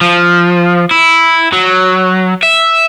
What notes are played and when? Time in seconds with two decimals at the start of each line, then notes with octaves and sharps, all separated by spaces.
0.02 F3
0.91 E4
1.53 F#3
2.43 E5